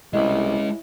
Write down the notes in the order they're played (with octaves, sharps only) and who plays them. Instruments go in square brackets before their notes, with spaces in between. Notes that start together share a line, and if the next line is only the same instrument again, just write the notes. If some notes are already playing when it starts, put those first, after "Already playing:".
[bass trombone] C2 [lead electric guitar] G#3 C#4 [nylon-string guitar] E4 [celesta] D#5